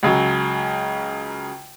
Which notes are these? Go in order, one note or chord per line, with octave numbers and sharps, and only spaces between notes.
C#2 C#3 F#3